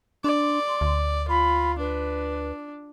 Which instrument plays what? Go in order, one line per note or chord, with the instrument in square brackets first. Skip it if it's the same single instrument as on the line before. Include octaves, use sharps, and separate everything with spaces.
[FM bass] D4 [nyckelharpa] D5 [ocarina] C6
[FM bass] D2
[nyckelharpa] F4 [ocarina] B5
[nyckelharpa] D4 [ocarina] B4